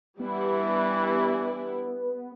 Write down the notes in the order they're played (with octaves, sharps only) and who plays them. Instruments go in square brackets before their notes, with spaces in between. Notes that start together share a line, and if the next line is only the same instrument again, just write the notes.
[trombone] E3 [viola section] G3 D4 E4 [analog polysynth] B3